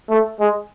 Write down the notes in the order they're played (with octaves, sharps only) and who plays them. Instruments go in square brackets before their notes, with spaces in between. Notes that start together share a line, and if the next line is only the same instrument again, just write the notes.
[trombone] A3
G#3